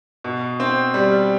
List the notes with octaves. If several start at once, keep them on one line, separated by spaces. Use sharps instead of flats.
B2
C4
G3